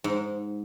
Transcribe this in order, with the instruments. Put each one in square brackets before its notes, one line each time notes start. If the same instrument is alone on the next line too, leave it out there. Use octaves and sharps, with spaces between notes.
[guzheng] G#2